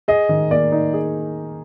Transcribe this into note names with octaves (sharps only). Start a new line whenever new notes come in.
G#4 D#5
D#3
A#3 D5
D#4
G#4